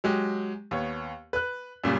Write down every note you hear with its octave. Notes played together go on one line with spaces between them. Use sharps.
F#3 G#3 G4
D#2 B3 C#5
B4 F#6
F#2 A#2 C#3 G3